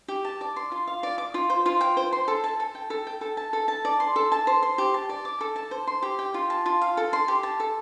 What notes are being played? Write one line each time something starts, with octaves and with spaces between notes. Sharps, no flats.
G4
A5
D5
C6
F4
F5
D5
D6
F4
C5
F4
G5
C5
C6
A4
A5
A4
G5
A4
G5
A4
A5
A4
A5
D5
C6
A4
A5
C5
C6
G4
A5
D5
D6
A4
A5
C5
C6
G4
G5
F4
A5
F4
F5
A4
C6
G4
A5
A4